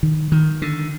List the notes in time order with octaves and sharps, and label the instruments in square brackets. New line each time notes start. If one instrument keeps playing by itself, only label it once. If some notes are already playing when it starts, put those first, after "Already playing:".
[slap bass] D#3
D#3
D3